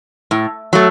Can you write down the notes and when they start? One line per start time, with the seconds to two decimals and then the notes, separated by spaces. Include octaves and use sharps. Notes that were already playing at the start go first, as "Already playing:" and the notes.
0.31 A2
0.73 F#3 A3